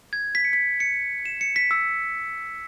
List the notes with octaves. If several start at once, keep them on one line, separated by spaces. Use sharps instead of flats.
G#6
B6
C#7
B6
C#7
E7
C#7
B6
E6